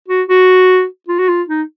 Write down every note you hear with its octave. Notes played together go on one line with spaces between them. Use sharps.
F#4
F#4
F4
F#4
F4
D#4